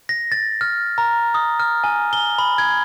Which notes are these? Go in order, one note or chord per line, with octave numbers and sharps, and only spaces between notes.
A#6
A6
F6
A#5
D#6
F6
G#5
G7
B5
G#6